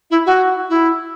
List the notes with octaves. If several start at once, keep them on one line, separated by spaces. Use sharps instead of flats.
E4
F#4
E4